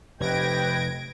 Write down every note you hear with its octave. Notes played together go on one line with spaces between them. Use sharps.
F1 G4 B4 D#5 G5 G#6 A#6 D7